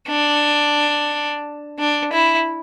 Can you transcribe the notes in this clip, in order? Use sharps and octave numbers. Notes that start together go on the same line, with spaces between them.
D4
D4
E4